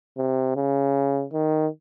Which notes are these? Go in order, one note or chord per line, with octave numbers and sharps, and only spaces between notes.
C3
C#3
D#3